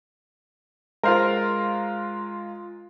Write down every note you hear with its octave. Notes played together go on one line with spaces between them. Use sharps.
G#3 F4 A#4 C5 F5